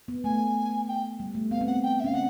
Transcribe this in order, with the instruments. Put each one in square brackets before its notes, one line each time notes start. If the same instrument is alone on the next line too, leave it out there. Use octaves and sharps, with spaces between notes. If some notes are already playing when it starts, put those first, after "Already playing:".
[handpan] B3
[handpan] A3 [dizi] G#5
[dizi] G5
[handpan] G3
A3
[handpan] B3 [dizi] F5
[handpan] C4
[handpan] B3 [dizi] F#5
[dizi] G5
E5
[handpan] C#4 [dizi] F5
[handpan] C4 [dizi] F#5